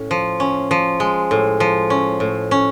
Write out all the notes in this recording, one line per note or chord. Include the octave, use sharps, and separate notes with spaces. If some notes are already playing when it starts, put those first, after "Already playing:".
Already playing: A2 C#4
F3
C#4
F3
G#3
A2
F3
C#4
A2
C#4